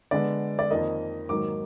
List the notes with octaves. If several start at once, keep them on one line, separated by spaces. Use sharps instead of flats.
D3 G#3 B3 D5
D5
F2 D#3 A#3 D#5
G#2 D#3 F#3 A#3 D6